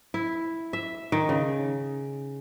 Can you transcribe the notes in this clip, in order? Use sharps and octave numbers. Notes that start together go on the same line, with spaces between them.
E4
E5
D#3
C#3